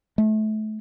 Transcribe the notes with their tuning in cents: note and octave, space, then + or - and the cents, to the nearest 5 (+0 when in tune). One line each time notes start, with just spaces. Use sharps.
A3 -30